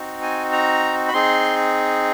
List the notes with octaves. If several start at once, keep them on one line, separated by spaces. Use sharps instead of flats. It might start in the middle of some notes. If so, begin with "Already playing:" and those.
Already playing: C4 D#4 F#4
G#5
A#5
B5
C4 D#4 G#4 C6